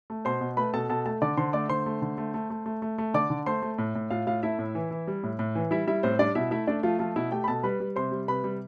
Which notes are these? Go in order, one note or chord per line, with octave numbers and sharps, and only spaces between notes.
A3
B2 C5 C6
B2
A3 B4 B5
B2 A4 A5
B2 A4 A5
A3 A4 A5
D3 D5 D6
D3 C5 C6
A3 D5 D6
D3 C5 C6
A3
D3
A3
A3
A3
A3
A3
A3
D3 D5 D6
D3
A3 C5 C6
A3
A2
A2
A2 F4 F5
A2 F4 F5
A3 E4 E5
A2
E3
E3
G3
A2
A2
E3
G3 E4 E5
G3 E4 E5
A2 C4 C5
G3 D4 D5
B2 E4 E5
A3 E4 E5
A3 D4 D5
F3 A3 F4
F3 A3 F4
B2 E4 E5
A3 G4 G5
B5
B2 A4 A5
G3 B4 B5
G3
C3 C5 C6
G3
C3 B4 B5
G3